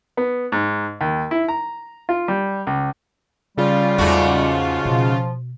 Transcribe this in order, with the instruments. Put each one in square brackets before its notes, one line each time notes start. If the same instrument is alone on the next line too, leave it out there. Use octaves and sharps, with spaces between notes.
[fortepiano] B3
G#2
D#2
E4
A#5
F4
G3
C#2
[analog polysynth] C#3 F4 [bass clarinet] G3
[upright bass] E2 D#4 [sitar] G#2 A3 F#4
[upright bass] B2 [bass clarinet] F3